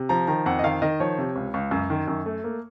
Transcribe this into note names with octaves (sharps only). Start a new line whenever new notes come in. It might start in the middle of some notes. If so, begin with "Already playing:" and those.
Already playing: C3
F3 A#5
D#3 A#5
F2 F#5
D#5
D#3 F5
D#3 D#5
F3 C#5
C3
C#2
C#2
F#2
D#3
F#2
A3
A#3